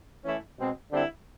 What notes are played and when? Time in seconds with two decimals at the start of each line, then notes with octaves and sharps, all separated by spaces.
0.24 E3 A3 C#4 E4
0.59 B2 G#3 C4
0.91 D3 G3 C4 E4